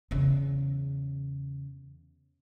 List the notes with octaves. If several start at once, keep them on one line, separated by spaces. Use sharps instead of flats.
E2 C#3